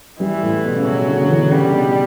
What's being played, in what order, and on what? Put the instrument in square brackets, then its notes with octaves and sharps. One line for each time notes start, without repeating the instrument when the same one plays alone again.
[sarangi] E3 [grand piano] G3
[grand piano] A2
B2
C#3
[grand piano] B2 [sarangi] F#3
[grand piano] D3
D3
E3
[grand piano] C#3 [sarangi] G3
[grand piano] B2